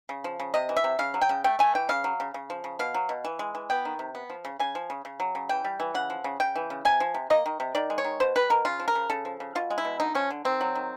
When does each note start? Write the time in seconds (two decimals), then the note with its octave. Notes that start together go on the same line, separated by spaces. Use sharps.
0.09 C#3
0.24 F3
0.40 C#3
0.54 C3 D#5
0.69 E3
0.77 E5
0.84 C3
0.99 C#3 F5
1.14 F#3
1.21 G5
1.29 C#3
1.44 A3 G5
1.59 A3 G#5
1.75 E3 G5
1.89 C#3 F5
2.04 F#3
2.20 C#3
2.34 C#3
2.50 F3
2.64 C#3
2.79 B2 F5
2.94 F#3
3.09 B2
3.24 E3
3.39 G#3
3.55 E3
3.70 B3 G5
3.85 D#3
3.99 C3
4.15 B3
4.30 F3
4.45 C#3
4.59 C#3 G#5
4.75 F3
4.90 C#3
5.05 C#3
5.20 F#3
5.35 C#3
5.49 E3 G5
5.64 G3
5.80 E3
5.94 C#3 F#5
6.10 F3
6.24 C#3
6.40 C#3 G5
6.55 E3
6.70 C#3
6.85 C3 G#5
7.00 F3
7.14 C3
7.30 A#3 D#5
7.46 D#3
7.60 C3
7.75 D#3 D5
7.90 G#3
7.98 C#5
8.04 D#3
8.20 B2 C5
8.35 G3 B4
8.50 B2 A#4
8.65 C#3 F4
8.80 F3
8.88 A#4
8.95 C#3
9.10 C#3 A4
9.25 F3
9.40 C#3
9.55 B2 F4
9.70 G#3
9.78 E4
9.85 B2
10.00 D3 D#4
10.15 F3 C#4
10.30 D3
10.45 D#3 C4
10.61 F#3
10.75 D#3